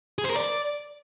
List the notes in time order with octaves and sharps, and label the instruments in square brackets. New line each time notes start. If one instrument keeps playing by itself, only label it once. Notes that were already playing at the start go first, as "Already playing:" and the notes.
[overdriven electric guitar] G#4
C5
A#4
D5